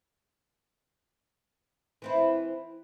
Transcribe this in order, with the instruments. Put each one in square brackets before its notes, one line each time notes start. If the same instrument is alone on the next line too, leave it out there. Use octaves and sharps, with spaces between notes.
[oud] E3 C4 E4